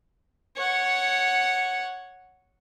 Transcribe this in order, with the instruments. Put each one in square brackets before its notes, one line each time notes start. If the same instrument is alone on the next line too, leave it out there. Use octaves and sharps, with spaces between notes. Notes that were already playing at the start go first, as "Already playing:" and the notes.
[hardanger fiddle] C#5 F#5